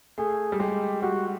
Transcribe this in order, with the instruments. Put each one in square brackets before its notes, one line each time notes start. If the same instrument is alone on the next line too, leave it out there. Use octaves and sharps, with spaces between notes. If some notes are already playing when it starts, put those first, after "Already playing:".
[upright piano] A3 [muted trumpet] G#4
[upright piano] G3
[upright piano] G#3 [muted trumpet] G4
[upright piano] G3 [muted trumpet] F#4